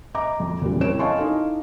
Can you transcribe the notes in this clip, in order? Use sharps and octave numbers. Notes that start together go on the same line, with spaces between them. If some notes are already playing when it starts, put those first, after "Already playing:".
D#5 E5 A#5 D6
F2
E2 A#2 C#3 G3
C4 E4 C#5 D7 E7
D#5 F5 G#5 A5 C6 C#6
D#4 E4 A4 F5